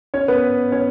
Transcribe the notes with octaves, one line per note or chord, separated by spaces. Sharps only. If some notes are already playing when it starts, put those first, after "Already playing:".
C#4 C#5
B3 B4
C#4 C#5